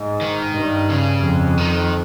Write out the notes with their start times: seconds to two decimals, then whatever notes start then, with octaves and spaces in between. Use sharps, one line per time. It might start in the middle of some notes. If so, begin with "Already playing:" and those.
Already playing: G#2
0.21 D#3
0.55 G2
0.90 C#3
1.25 F2
1.58 D#3